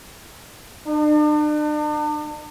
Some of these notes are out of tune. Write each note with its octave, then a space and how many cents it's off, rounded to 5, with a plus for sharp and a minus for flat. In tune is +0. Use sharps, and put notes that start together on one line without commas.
D4 +40